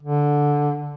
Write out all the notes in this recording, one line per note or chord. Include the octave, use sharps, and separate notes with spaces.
D3